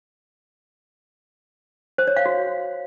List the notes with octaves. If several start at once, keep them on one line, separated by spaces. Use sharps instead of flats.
C5
C#5
F5
F#4